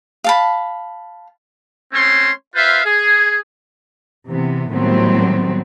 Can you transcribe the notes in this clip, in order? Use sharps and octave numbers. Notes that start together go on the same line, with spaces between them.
F5 A5 B5
A3 C4 C#4 C#5 C6
F4 B4 C5 E5 F5
G#4
C3 E3 B3
A2 D#3 F#3 G3 B3 C4